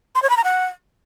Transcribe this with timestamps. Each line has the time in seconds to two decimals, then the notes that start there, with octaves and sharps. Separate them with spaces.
0.15 C6
0.22 C#5
0.30 B5
0.37 A#5
0.44 F#5